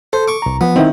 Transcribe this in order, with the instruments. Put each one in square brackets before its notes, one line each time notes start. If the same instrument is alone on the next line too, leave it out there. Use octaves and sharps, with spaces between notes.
[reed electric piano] A4 [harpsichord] C5
[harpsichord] C#6 D6
[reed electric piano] C2 A#5
[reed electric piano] F3 [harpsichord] B3
[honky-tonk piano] D#3 [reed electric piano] C4 E4 E5